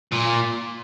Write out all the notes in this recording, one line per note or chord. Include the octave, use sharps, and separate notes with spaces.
A#2